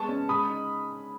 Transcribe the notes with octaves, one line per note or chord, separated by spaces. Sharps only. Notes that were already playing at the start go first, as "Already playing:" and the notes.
Already playing: G#3 B3 A5 C#6
C#4
G#3 B5 D#6
D#4